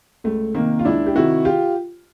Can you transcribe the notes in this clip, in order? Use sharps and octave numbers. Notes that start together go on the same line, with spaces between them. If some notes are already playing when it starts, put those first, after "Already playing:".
C#2 A3
C3 D#3 A#3
F4
C#2 D4 E4
G4
C3 D#3 E4 F#4
F4 G4